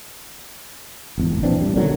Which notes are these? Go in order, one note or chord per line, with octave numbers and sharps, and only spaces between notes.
G#1 E2
A1
A#1 E3 C4 D4
G3
B1 D3 D#3 F#3